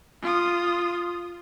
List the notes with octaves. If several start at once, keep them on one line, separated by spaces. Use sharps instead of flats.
F4 D#6